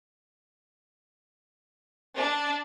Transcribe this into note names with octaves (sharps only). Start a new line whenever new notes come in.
D4